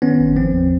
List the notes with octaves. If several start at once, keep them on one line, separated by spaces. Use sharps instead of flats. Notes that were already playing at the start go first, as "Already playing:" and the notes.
D#3 B3 C#4
G#1
F3 C4
E2